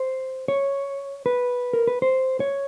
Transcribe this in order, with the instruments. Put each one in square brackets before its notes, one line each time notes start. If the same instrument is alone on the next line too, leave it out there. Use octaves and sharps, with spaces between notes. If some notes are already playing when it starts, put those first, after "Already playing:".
Already playing: [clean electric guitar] C5
C#5
B4
A#4
B4
C5
C#5